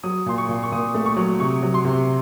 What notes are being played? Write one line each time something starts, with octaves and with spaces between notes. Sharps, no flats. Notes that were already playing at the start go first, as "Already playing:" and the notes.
F#3 D#6
A#2 C6
C#6
A#2
C#6
A#2 D#6
A3
C#6
F#3
C3 C#6
F#3
C6
C3